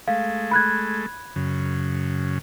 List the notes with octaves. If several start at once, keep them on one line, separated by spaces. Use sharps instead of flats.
G#3 A3 F5
B5 F#6 G#6
F#2 C#3